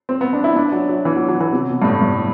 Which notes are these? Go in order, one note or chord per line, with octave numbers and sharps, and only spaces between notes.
C4
B3
D4
E4
D4
F#3
F#3
E3
F#3
F#3
E3
C3
B2
G2
A2
G2